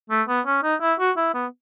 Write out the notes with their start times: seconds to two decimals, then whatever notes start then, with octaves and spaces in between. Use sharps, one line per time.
0.10 A3
0.28 B3
0.46 C#4
0.63 D#4
0.81 E4
0.99 F#4
1.17 E4
1.34 B3